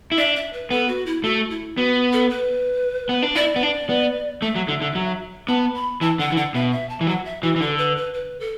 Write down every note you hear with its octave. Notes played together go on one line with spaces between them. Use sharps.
E4
D4 E5
E5
B4
B3 A4
F#4
E4
A3 F#4
E4
B3 F#4
A4
B4
B3
D4
E4 D5
B3
D4
B3
A3 E5
F#3
D3
D3
F#3
B3 A5
B5
E3 A5
D3 F#5
E3
D3 F#5
B2 E5
E5
A5
E3
F#3 F#5
E5
E3 F#4
E3
D3 A4
B4
B4
B4
A4